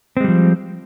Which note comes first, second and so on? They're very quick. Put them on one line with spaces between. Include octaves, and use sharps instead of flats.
C4 G#3 G3 F3